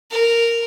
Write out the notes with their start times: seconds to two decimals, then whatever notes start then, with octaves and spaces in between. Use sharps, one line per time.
0.11 A#4